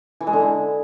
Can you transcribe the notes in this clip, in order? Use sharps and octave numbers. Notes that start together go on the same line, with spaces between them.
E3
G#3
D3
E4